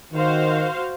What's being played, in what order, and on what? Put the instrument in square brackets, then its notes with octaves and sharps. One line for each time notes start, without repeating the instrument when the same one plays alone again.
[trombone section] D#3 [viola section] F#4 C5 F5